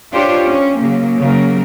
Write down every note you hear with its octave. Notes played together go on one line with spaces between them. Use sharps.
D4 F4 G4 C5 C#5
C#4
C#3 F#3 A#3
C#3 F#3 A#3 A#4